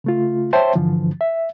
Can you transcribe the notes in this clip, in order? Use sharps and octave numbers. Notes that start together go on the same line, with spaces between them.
C#3 A3 F4
C5 C#5 E5 G5 A5 C6
G2 D3 E3 F3
E5